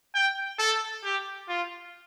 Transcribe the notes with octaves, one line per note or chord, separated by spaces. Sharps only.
G5
A4
G4
F4